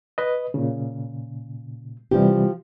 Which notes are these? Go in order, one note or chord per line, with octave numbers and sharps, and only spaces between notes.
B4 D#5
A#2 C#3
C3 E3 F3 G3 G4